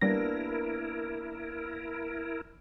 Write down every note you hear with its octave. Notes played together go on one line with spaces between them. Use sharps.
G3 A#3 B3 D4 E4 A#4 A#6